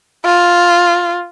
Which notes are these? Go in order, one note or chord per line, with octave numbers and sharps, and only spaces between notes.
F4